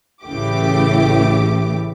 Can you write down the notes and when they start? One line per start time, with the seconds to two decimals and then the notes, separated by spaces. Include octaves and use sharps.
0.24 A1 C#3 E3 A3 G4 D6